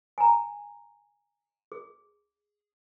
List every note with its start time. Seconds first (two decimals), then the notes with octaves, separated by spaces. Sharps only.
0.18 G#5 A#5
1.72 G#4